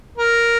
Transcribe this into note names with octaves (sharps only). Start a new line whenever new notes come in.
A#4